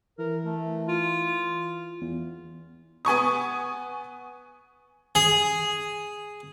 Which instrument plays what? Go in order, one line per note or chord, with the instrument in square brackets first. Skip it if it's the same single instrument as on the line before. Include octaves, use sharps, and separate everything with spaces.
[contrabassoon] E3 [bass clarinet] A#4
[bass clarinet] A3
F4
[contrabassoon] E2
[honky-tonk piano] B3 G#5 C#6 D#6
[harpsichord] G#4